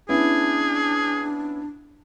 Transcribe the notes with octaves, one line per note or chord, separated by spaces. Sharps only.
B3 C#4 D4 E4 G#4